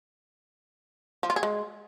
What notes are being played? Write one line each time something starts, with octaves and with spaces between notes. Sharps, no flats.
F3
F4
G#4
G#3